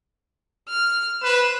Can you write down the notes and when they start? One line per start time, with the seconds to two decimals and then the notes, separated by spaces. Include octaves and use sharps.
0.69 F6
1.23 B4 C5 E7